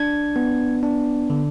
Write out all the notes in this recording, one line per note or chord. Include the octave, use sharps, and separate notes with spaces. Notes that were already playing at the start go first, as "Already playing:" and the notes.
Already playing: D4 G#6
B3
D4
D3